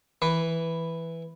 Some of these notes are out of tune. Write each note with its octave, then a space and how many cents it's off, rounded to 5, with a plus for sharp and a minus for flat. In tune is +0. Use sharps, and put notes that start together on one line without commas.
E3 +0 B4 +5